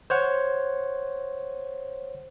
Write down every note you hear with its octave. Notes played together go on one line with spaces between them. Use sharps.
C5 C#5 F#5